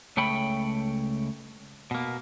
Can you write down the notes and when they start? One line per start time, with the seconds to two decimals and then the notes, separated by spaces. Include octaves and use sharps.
0.17 C#2 A3 C#5 G5 B5
1.91 B2 A#3